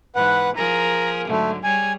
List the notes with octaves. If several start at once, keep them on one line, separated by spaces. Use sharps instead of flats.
G#2 E3 B4 F#5
F3 G#4 A#4 A#5
G#2 D3 F#3 A3
G3 G#4 C#5 G#5